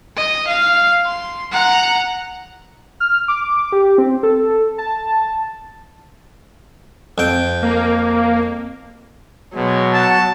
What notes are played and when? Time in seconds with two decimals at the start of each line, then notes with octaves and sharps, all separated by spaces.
0.17 D#5
0.48 F5
1.06 C6
1.52 F#5 A#5
3.00 F6
3.28 D6
3.72 G4
3.98 C4
4.23 A4
4.78 A5
7.18 F2 G5
7.63 A#3
9.55 B2 F#3 G#3
9.93 F#5 A5